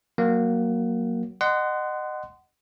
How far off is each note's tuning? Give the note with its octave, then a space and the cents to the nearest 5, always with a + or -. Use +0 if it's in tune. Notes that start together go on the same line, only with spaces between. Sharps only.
F#3 +0 A#3 +0 F#5 +20
D#5 -25 F#5 +15 C6 -20